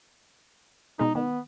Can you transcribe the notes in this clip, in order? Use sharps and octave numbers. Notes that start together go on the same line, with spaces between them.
B2 G#3 D#4
D#3 B3